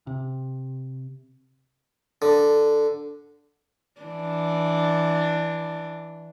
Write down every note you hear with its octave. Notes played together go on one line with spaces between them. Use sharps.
C3
D3
E3 D4